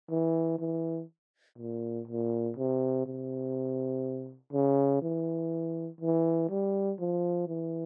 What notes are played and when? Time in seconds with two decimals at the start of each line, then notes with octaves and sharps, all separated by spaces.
0.10 E3
0.59 E3
1.58 A#2
2.07 A#2
2.57 C3
3.06 C3
4.53 C#3
5.02 E3
6.00 E3
6.49 G3
6.99 F3
7.48 E3